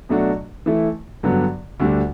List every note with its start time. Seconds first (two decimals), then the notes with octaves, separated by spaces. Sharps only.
0.09 B2 F#3 A3 D4 F#4
0.66 E3 A3 E4
1.23 G2 D3 F#3 B3
1.80 D2 D3 G3